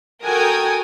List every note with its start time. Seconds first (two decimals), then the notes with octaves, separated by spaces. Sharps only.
0.24 F#4 A4 A#4 G5 G#5 D#6